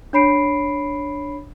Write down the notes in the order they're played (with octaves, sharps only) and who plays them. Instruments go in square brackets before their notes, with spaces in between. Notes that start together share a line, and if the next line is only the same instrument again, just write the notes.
[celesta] D4 C#5 B5 C7 D7